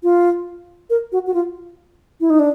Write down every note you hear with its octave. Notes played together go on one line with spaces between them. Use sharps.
F4
A#4
F#4
F#4
F4
E4
D#4
D4